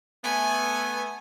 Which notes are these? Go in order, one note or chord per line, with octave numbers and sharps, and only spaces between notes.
A3 B3 G#5